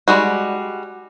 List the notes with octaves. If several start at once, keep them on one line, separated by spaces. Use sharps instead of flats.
G3 G#3 F#4